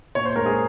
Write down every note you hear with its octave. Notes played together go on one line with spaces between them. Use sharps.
A#2 C#5
C5
G#3 A#4
G#4